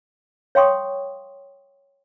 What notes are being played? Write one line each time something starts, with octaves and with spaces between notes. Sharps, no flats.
C#5 F5 G5 C6 C#6 D#6